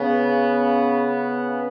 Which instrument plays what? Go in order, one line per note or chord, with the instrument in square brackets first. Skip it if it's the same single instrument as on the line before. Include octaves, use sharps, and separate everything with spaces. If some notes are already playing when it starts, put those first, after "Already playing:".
Already playing: [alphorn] C#3 [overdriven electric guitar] B3